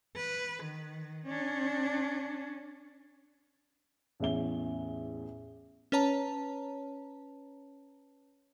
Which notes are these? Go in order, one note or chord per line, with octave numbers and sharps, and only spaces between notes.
B4
D#3
C#4 D4
A1 E2 E5 G7
C#4 B4 C#5 A5 A#5